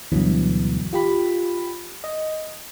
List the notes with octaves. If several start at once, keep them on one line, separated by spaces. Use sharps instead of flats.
D2 G2 B2 E3 F#3
F4 G4 B5
D#5